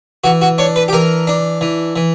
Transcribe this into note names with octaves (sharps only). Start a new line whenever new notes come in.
E3 F#4
F#4
D4 C#5
B4
G4
E3 A#4
D4
E3
E3